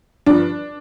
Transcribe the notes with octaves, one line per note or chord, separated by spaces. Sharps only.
G2 F3 D4